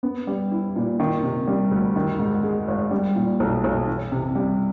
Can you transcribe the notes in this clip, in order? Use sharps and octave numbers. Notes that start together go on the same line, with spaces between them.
B3
G3
E4
A#2
D#3
C3
G3
D2
D#3
G#2
G#3
G#1
G3
A#2
B1
B1
E3
C3
G3